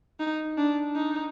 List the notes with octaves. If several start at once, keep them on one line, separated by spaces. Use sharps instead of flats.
D#4
D4
D#4